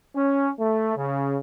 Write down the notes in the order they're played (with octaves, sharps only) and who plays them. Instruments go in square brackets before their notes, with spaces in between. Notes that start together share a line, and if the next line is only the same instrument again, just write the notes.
[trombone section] C#4
A3
C#3